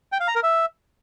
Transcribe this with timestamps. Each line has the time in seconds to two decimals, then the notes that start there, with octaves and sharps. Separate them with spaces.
0.12 G5
0.20 F5
0.28 A#5
0.35 A#4
0.43 E5